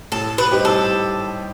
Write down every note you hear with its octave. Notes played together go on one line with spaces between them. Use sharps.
A2 A4
B4
G3 D#4 G4 C5
A4